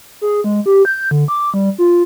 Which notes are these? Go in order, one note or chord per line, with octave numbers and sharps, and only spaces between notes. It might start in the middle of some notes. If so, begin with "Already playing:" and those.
G#4
G#3
G4
G6
D3
D6
G3
F4